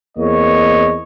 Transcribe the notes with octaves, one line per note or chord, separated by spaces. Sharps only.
E2 A#3 C4 C#5 D#5